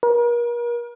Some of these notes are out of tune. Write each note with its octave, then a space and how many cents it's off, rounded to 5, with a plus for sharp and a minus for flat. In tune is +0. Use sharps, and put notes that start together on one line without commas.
A#4 +40